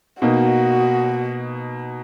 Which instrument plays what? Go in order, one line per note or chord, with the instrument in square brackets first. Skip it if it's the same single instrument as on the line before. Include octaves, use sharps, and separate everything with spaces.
[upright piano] B2 A#3 D#4 [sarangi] F#4